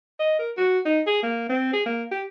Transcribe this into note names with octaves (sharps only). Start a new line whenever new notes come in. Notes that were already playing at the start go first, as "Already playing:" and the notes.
D#5
A#4
F#4
D#4
G#4
A#3
C4
G#4
A#3
G4